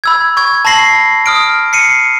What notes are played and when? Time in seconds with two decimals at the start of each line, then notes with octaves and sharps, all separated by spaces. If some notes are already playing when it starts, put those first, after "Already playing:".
0.04 B5 E6 G#6
0.37 C#6 G#6
0.65 A5 B5 C#6 A#6 C7 F#7
1.26 D#6 F6 D7
1.73 C7 C#7 D#7